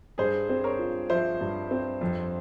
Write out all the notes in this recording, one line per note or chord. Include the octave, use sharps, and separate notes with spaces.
G2 G#4 C5
C4
A#4 C#5
F4
F3 C5 E5
G2
C4
F2